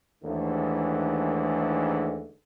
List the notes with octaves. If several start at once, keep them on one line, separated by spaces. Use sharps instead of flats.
D#2 G#2 D3 E3 G#3 A3